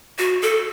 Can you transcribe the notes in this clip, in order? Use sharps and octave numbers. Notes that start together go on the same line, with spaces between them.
F#4
A4